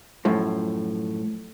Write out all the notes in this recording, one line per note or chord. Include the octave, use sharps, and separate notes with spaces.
F#2 A2 F3